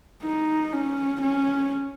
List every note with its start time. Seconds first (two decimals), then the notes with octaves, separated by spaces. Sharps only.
0.23 D#4
0.73 C#4
1.22 C#4